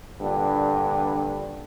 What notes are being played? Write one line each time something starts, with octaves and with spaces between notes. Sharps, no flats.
G2 A#2 D3